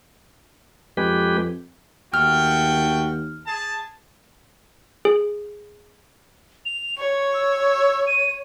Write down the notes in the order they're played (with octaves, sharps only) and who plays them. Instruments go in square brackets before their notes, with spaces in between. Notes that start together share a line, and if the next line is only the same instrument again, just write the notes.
[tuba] F2 [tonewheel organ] G#3 G4 B4
[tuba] D#2 [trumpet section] A3 F#4 G5 [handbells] F6
[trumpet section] G#4 A5
[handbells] G#4
[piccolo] F7
[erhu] C#5 [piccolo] C#6
[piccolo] E6
D#7